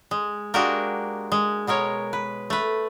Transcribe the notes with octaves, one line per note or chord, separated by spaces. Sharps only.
G#3
G#3 A#3 D4 F#4 G4 A#4
G#3
B2 G#3 A#4 C#5
B4
A3 B4